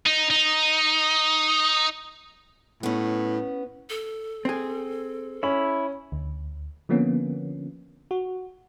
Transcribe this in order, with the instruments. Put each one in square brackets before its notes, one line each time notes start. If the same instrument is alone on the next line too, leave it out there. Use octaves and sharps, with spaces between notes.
[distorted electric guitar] D#4
D#4
[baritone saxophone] A2 [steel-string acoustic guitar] B3 C#4
[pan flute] A4
[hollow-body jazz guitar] C4 G#4
[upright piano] C#4 [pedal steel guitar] E4 B5
[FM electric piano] D2
D3 F3 A#3 B3 C#4
F#4